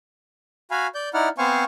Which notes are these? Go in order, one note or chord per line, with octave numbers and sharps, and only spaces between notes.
F#4 F5 G#5 B5
D5 G6
D#4 E4 D5 F#5 F6
B3 C4 C5 F5 G#5 C#6